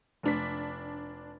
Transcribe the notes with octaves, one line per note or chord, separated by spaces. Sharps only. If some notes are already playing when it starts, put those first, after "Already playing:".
F1 D4 B6